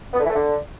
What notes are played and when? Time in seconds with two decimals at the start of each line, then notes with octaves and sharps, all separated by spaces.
0.13 B3
0.19 D3
0.24 E3
0.29 A3
0.35 D3